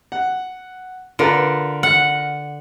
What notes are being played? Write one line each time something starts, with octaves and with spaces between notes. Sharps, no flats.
F#5
D3 F4 A#4 B4
F#5